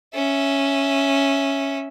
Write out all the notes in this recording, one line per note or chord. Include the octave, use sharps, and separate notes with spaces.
C#4 E5